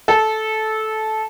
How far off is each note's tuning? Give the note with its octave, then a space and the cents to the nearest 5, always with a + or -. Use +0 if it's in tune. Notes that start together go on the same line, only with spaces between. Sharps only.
A4 -15